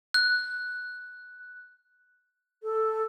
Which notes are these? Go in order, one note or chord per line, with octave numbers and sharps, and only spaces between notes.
F#6
A4